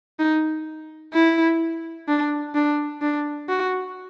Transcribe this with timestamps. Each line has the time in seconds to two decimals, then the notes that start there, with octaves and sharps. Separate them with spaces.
0.19 D#4
1.13 E4
2.08 D4
2.55 D4
3.02 D4
3.49 F#4